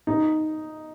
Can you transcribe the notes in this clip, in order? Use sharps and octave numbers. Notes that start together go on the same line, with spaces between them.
D#4